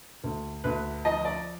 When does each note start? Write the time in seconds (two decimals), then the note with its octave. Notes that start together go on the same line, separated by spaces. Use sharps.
0.24 D2
0.64 D2 B4
1.05 F3 D#5
1.25 D5